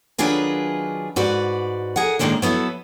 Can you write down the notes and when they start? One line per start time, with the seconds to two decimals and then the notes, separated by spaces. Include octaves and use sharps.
0.18 D#3 F#3 D4 F4 G#4 B4
1.16 G#2 F#4 B4 D5
1.96 G#4 A#4 F#5
2.19 A2 D#3 F3 G#3 A#3 D4
2.42 F#3 B3 E4 A4 E5